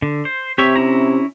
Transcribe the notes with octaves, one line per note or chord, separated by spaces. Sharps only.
D3
C5
C3 G4 C#5 E5
C#4 E4 A#5